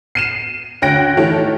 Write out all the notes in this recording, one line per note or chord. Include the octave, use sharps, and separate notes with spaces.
C7 D#7 E7
D2 C#4 G5 F#6 A#6 D7
D#3 E3 A3 G4 A4 C#5